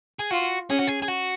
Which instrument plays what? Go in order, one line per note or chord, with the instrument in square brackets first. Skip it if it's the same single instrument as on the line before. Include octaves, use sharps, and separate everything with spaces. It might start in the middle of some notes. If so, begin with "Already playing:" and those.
[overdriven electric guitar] G#4
[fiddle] F4 [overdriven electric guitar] F#4
[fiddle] C#4 [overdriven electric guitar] G#4
[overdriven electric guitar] F#4
G#4
G#4
F#4